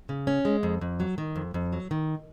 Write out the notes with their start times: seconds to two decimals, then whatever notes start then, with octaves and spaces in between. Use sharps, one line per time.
0.09 C#3
0.27 C#4
0.45 G#3
0.63 F2
0.81 F2
1.00 F#3
1.18 D#3
1.36 F2
1.54 F2
1.73 F#3
1.91 D#3